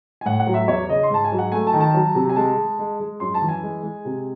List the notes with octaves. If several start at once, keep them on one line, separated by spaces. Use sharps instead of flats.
G#5
A2 F#5
F#5
F#3
E5
E2 C#5
C#3 D#5
C6
G#2 A5
G#5
F#3
F#5
A3 G#5
A5
D#3
A5
F#3
C3
G#5
G#3 A5
G#3
G#3
G#3
F#2 C6
A5
E3
G#5
G#3
G#3
C3